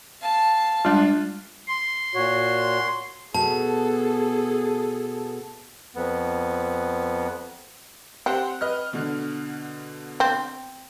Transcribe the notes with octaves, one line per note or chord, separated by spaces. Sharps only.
F5 A5
G3 G#3 D4 F4
C6
A#2 F#4 C#5
B2 G#4 A4 A5
F2 B3
C4 G4 C5 F#5
B4 D#5 F6
B2 D3
C4